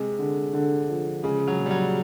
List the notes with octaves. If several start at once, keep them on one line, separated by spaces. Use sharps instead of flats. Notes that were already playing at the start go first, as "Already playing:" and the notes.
Already playing: C3 G#3
D3
D3
F3
C#3 G#3
F#3
A#2
G3
F#3